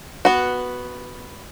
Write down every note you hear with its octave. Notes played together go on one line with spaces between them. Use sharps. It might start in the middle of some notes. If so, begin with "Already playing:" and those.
B3 F#4